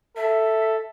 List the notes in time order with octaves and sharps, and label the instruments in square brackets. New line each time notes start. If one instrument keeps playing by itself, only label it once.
[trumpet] A4 [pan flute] E5